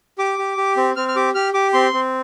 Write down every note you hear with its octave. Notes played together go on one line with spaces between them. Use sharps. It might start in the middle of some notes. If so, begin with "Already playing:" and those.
G4 D6
G4
G4
C4
C4 F6
F6
G4 D6
G4 F6
G4 D6
C4 C6
C4